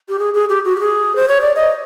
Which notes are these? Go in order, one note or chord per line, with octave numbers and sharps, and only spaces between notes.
G4
G#4
G#4
G4
F#4
G4
G#4
C5
C#5
D5
D#5